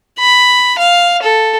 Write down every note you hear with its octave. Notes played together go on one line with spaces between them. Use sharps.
B5
F5
A4